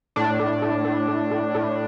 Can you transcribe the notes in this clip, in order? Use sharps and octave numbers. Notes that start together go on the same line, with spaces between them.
A2 D4
A2
A2
A2
A2
A2
A2